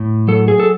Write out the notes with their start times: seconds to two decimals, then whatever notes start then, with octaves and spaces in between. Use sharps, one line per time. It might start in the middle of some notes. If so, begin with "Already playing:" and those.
Already playing: A2
0.28 F#3 A4
0.48 G#4
0.60 A4